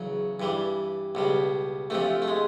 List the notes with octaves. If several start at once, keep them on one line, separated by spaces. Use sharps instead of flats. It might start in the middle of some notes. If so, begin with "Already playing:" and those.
Already playing: E2 C#3 F#3
G2 E3 G3
C#2 B2 G3
D2 C3 F3 A3
A3
G#3